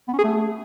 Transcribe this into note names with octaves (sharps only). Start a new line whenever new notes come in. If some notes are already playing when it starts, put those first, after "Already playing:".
B3
C#4
G#4
A3